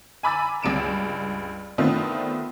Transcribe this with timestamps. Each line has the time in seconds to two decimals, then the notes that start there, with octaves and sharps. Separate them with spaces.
0.23 G#5 A#5 B5 D6 E6 A6
0.62 C#2 G2 D7 E7
1.78 D3 D#3 A3 B3 C4 F4